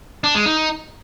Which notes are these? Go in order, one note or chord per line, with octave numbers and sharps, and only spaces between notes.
D4
G#3
D#4